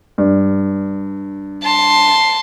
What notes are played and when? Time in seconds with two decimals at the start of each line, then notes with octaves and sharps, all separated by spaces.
0.18 G2
1.63 A5 C6